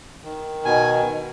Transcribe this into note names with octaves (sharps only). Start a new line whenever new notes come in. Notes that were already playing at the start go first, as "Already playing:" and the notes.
D#3
B2 G#5
B2